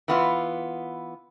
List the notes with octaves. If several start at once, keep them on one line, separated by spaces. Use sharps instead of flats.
E3 B3 F4